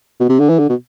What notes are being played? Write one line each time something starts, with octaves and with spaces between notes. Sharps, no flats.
B2
C3
D3
E3
D3
B2